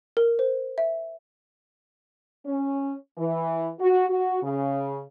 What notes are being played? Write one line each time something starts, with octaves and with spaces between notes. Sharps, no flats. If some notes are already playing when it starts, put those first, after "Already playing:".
A#4
C5
E5
C#4
E3
F#4
F#4
C#3